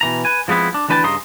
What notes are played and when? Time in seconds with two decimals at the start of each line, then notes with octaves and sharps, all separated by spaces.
0.01 B2 E3 A#5
0.25 B4 G#5
0.48 F3 G#3 B3 C4 E4
0.74 D4
0.89 D2 E3 D4 B4 G5 A5
1.03 G2 C#3 D#5 A#5 C6